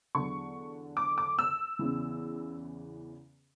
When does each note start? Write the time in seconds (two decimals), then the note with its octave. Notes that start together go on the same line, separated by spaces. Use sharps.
0.15 E2 D3 F#3 C#6
0.97 D6
1.18 D6
1.39 E6
1.79 E2 C#3 E3